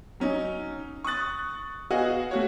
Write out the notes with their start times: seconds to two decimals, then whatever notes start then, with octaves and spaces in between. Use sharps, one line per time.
0.20 F#3 C#4 D#4
1.04 C#6 D#6 F#6 A6
1.90 B3 F#4 G#4 D#5 F5 F#5
2.31 A3 F#4 C#5